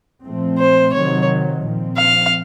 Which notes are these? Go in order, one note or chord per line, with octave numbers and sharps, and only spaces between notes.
A#2 F3 A3 C4
C5
C3 D#3 F#3 C#5
A#2 F3 C4
F5